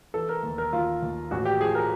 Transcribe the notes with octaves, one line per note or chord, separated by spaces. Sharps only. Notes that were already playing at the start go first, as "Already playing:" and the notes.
E3 A4
A#4
D#2
A#4
D#2 F4
D#2
A1 F#4
G4
F3 G#4
A#4